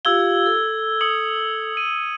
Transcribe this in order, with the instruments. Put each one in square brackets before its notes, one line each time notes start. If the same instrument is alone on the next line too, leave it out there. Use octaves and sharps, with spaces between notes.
[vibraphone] F4 G4 F5 [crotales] E6 G#6 G7
[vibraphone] A4
[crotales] D#6 C#7 F#7
D#7